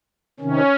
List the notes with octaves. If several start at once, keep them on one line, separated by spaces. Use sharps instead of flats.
C3 D#3 C#4